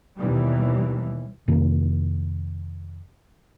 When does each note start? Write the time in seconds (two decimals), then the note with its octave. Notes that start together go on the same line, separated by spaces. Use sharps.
0.17 D#2 B2 E3 G3
1.48 F2 C3 D#3 A#3